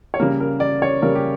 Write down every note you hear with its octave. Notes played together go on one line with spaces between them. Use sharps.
C#5
C#3 G3 A#3 A#4
A#4
D5
C#5
C#3 G3 A#3 A#4
G4